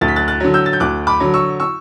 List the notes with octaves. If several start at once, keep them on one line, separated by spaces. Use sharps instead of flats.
D2 A6
B6
F#6 A6
F#6 A6
D3 F#3
E6 G6
A6
G6
D2 D6 F#6
B5 D6
D3 F#3
C#6 E6
C#6 E6